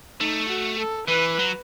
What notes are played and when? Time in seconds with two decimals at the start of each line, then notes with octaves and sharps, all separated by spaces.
0.21 A3 D#4
0.49 F#4
0.79 A4
1.07 E3 B4
1.39 F#3